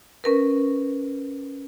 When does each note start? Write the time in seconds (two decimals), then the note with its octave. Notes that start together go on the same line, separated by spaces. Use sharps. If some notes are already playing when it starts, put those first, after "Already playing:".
0.24 C#4 A#4 B4